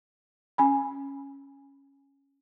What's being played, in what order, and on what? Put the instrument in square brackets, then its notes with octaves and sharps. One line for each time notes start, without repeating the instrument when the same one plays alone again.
[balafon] C#4 G#5 B5